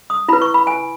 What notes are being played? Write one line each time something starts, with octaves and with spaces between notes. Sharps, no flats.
D#6
E4 B4 B5
C#6
B5
G#5